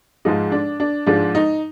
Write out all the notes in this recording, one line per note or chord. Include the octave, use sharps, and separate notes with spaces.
G#2 F3 G#3 D#4
D4
D4
G#2 F3 G#3 D4
D#4